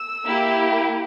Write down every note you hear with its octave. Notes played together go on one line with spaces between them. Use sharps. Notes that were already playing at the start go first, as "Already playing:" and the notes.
Already playing: E6
A#3 E4 G4